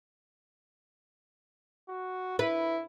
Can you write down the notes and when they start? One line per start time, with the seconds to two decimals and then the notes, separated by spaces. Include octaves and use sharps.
1.89 F#4
2.39 E4 B4